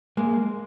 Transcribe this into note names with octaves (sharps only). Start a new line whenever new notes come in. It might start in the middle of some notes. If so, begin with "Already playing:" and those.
G#3 A#3